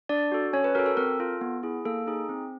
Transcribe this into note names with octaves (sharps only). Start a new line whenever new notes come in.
D4 D5
F#4 A4
C#4 C#5
B4
F#4 A4 A#4
A4
C4 A#4
F4 A4
B3
E4 G#4
A#3 A4
D#4 G#4
C4